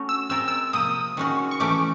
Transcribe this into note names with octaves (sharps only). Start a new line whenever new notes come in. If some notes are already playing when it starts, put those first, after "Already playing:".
Already playing: A3 C#4 F#4
E6
G#3 C4 F4 A#4 E6
E6
C3 F3 A#3 D#6
D#3 G#3 C#4 F#4
C#6
E3 A3 C#4 D6